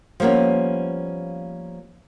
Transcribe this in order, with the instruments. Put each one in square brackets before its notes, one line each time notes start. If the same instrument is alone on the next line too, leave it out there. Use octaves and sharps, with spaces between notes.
[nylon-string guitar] F3 G3 A#3 B3 C#4